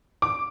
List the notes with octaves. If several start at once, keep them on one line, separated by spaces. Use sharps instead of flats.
D6